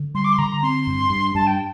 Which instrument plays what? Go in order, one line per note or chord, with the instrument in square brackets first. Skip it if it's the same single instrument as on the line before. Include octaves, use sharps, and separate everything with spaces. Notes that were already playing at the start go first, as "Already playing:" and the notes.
Already playing: [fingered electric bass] D3
[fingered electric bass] G3 [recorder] C6
[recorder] D6
C6
[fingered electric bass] D3 [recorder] A#5
[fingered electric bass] C4 [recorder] C6
[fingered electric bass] G2
G2
[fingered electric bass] G2 [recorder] A5
[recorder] G5